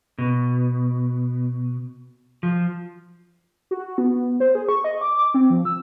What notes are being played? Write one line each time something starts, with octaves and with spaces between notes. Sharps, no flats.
B2
F3
F#4
B3
C5
G#4
C#6
D#5
D6
D6
C4
F3
E6